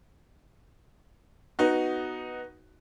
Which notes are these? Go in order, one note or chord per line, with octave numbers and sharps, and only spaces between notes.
B3 D#4 F#4